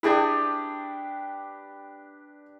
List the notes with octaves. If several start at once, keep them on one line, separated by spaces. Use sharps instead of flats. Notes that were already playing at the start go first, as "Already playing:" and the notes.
D4 E4 G4 G#4 B4 G5